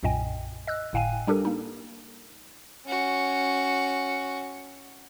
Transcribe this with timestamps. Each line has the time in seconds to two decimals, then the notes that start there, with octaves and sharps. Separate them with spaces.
0.03 B1 F#2 A#2 D#5 G5 G#5
0.67 D#5 E6 F#6
0.93 G1 A2 F5 G5 G#5 D#7
1.27 G3 D4 G4 A4 A#4
1.45 A#3 D#4
2.87 C#4 F#4